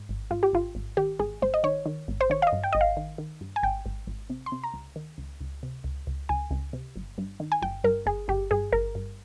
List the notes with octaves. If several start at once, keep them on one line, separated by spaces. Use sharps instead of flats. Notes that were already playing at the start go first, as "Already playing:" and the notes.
Already playing: G#2
G#1
G#2 F4
G4
G#1 F4
G#1
D#3 G4
G#1 G#4
G#1 C5
D#5
D#3 C#5
D#3
G#1
C5
D#3 C#5
F5
D#5
G2
G5
G#1 D#5
F5
D#3
D#3
G2
G#5
G#1 G5
G#1
G#1
C3
C6
C3
A#5
C#2
D#3
C#2
C#2
C3
C#2
C#2
C#2 G#5
C#2
C3
G1
G2
D#3
G#5
G1 G5
G2 A#4
G1 G#4
G1 G4
G2 G#4
G1 A#4
G2